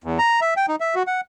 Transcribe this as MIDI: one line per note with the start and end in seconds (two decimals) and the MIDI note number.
0.04 0.19 40
0.19 0.40 82
0.41 0.54 76
0.57 0.66 79
0.68 0.76 63
0.80 0.95 76
0.95 1.03 66
1.07 1.21 78